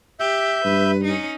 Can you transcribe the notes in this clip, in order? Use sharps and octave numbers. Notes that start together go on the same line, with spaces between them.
G4 E5 G6
G2 B4
C#4 D#4